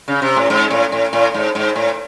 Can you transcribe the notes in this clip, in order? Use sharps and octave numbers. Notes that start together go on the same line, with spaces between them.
C#3
C3
A2
G#2
A2
A2
A2
G#2
G#2
A2